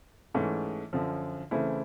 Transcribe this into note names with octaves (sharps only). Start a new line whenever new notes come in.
G#2 E3 A3 C#4
F#2 D3 F3
C#3 E3 A3 C4 E4